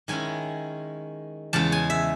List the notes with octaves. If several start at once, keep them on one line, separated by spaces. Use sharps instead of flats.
D#3 G#3 C#4 E4 G#5
E2 C#3 G#3 A5
G#5
E5